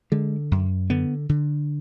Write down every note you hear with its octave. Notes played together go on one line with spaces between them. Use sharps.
D3 G#3
F#2
D3 B3
D3